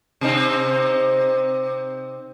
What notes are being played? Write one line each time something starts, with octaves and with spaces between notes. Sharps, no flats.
C3 C4 D#4